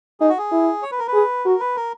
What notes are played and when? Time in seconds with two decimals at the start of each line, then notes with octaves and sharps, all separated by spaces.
0.20 D#4 G#4
0.29 F#4
0.38 G#4
0.51 E4
0.82 C#5
0.91 B4
0.99 A#4
1.07 B4
1.13 G#4
1.45 F#4 A#4
1.60 B4
1.76 A#4